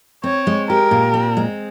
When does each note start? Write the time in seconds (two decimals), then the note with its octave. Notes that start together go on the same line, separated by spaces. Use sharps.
0.24 C4 C#5
0.47 G#3
0.69 G4 A#4
0.91 A#2
1.14 C4
1.37 G#3